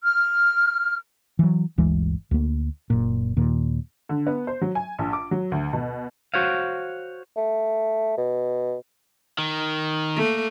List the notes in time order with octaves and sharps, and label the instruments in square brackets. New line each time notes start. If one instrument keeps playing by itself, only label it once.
[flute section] F6
[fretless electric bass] E3 F#3
G1 D2 E3 G#3
D2 A#3
F#1 A#2
D#2 A#2
[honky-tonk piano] D3
B3
C5
F#3
G#5
A#1
D6
F#3
D2
B2
[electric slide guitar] F#4 C5 C#5 F5
[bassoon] A3
B2
[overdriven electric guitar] D#3
[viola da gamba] A3 A#3